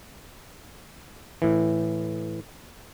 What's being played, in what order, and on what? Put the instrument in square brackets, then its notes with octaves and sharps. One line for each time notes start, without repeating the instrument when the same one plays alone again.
[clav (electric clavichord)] A2 E3